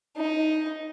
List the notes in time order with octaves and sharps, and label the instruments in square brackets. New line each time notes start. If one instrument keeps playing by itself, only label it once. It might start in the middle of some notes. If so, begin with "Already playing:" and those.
[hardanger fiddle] D#4